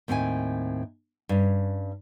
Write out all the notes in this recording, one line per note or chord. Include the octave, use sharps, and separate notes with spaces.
D#2 A2 C4 F5 G#5
G2 C#4